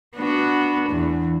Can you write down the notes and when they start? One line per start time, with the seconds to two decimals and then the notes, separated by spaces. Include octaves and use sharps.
0.16 B3 D4 F#4
0.90 E2